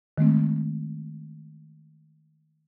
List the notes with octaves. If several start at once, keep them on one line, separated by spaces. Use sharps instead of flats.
D#3 G#3 A3 C4